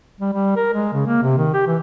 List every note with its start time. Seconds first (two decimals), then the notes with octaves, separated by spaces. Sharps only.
0.20 G3
0.33 G3
0.56 A#4
0.74 G#3
0.93 C#3
1.07 A#3
1.22 C3
1.37 D#3
1.53 G4
1.67 E3